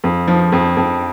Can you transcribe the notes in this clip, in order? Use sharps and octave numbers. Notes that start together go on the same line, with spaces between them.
F2
F3
F2
F2